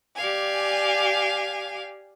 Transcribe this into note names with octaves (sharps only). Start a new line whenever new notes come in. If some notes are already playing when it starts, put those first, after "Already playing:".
G4 D5 F5 G#5